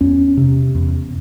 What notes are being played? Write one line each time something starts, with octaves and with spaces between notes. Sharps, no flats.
E2 C#4
C3
E2